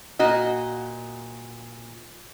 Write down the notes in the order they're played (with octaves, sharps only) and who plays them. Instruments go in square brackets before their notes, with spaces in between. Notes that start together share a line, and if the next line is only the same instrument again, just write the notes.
[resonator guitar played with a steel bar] A#2 F#4 D#5